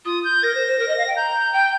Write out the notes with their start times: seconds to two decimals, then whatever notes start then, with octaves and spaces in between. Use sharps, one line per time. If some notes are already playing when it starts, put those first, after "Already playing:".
0.05 F4 D#6
0.24 G6
0.42 A#4 A#6
0.55 C5
0.67 C5
0.79 A#4
0.88 D#5
0.98 F5
1.07 G5
1.16 A#5 G6
1.53 G5